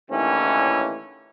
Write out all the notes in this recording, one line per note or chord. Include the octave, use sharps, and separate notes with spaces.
D#2 A2 D3 E3 C#4